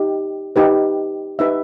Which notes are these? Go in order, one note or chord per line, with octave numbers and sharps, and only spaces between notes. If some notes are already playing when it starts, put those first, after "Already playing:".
Already playing: D#4 G4
D#4 G4 B4
D#4 G4 B4 E5